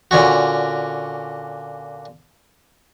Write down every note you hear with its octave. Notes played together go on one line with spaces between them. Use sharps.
A#2 D3 C#4 F#4